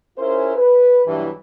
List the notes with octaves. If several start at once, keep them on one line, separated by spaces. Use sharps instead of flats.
C#4 E4 F4 G#4 A#4 C5
B4
B1 G2 E3